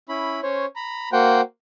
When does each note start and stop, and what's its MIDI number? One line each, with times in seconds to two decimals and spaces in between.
0.09 0.40 61
0.09 0.40 64
0.09 0.40 83
0.43 0.66 61
0.43 0.66 72
0.43 0.66 73
0.76 1.09 82
0.76 1.09 83
1.12 1.41 58
1.12 1.41 66
1.12 1.41 72
1.12 1.41 78
1.12 1.41 79